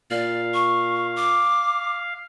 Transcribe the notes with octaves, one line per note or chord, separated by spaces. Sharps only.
A#2 D5 F5
C#6
D6